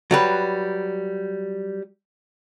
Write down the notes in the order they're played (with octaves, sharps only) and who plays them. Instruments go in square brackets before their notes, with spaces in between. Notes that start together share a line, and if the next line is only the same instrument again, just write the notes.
[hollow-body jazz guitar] F#3 G3 B4